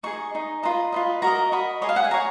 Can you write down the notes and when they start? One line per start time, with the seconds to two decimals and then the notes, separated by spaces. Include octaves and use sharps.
0.03 D#4 G#4 D#5 C#6
0.34 D#4 G#4 D#5
0.63 F4 B4 D#5 A#5
0.92 F4 B4 D#5
1.22 F#4 A#4 D#5 A#5
1.52 F#4 A#4 D#5 B5
1.81 G#4 C#5 D#5
1.89 F5
1.96 F#5
2.04 G#5
2.11 G#4 C#5 A#5